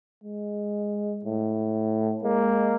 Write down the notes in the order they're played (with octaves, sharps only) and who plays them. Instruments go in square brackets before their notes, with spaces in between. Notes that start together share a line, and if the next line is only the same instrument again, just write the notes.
[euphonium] G#3
A2
[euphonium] G#3 [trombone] A#3